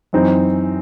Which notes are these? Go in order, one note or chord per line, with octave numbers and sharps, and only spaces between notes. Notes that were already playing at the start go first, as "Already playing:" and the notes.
F#2 E3 C4 D#4